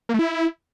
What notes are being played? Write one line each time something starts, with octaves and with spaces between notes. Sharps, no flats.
A#3
A3
E4